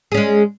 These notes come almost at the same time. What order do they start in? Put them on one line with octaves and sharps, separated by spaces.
G#4 C#4 G#3